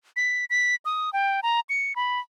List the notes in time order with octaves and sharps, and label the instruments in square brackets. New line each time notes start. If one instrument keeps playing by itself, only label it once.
[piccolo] B6
B6
D#6
G5
A#5
C#7
B5